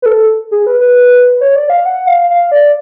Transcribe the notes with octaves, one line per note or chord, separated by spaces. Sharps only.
B4
A4
G#4
B4
B4
C#5
D5
F5
F#5
F5
F5
D5